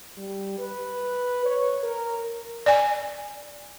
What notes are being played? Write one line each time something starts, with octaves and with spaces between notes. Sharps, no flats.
G3
B4
C#5
A#4
D5 G#5